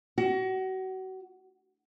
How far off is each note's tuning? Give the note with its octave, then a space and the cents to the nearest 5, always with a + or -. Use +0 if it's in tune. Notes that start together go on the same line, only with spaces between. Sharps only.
F#4 +30